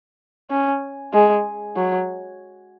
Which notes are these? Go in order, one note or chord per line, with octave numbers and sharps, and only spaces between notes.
C#4
G#3
F#3